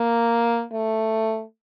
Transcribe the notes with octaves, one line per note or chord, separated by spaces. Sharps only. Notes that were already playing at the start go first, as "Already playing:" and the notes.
Already playing: A#3
A3